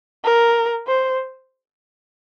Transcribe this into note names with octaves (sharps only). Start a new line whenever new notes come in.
A#4
C5